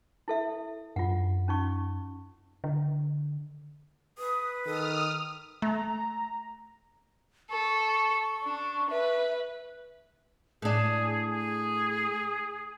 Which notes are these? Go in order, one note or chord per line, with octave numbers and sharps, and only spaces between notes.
E4 A4 E5
F#2 D4 F4 F#5
C#4 D#4 C#6
D3
B4 D#6
D#3 A4 D#6 F6
A3 A#5
A4 C#6
D4
B4 E5
A2 D4 G#4
G#4